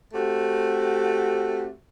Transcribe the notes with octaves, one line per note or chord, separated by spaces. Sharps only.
A3 C4 F#4 G4